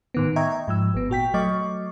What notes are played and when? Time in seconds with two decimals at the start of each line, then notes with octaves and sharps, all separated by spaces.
0.14 A2 D#3 B3
0.36 D#5 E5 G5 A#5 C#6 G#6
0.68 G#2 F3 E6
0.94 G#1 B3
1.10 A#2 F#4 G5 B6
1.34 F#3 A3 D#5 C#6 D6